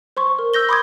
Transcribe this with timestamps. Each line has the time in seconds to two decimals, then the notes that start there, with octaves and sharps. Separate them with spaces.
0.17 C5 C6 C#6
0.39 A#4
0.54 E6 G6 A#6 G7
0.69 B5 C6 D6 D#6 G6 G#6